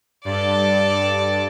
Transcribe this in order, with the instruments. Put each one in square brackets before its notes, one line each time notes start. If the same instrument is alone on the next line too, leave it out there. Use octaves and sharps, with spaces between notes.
[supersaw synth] G2 [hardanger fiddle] A4 D5